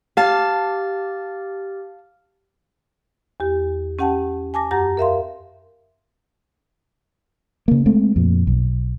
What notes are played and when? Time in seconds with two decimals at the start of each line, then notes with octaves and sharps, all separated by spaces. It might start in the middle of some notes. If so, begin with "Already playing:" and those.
0.17 G4 F5 A5 F6 A6
3.40 E2 G4
3.99 C#4 G4 F#5 G5 A5
4.54 G#5 A5 D6 A#6
4.71 F#2 G4 F#5 A#5 A#6
4.97 A#4 E5 F5 C6
7.68 C#3 A#3
7.86 G#3 A3 C4
8.16 F2 A#2
8.47 B1